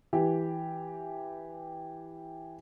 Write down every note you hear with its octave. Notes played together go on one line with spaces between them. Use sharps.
E3 G4